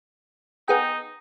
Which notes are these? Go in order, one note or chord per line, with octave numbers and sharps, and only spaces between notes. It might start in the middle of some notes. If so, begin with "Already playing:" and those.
B3 D#4 G#4 G5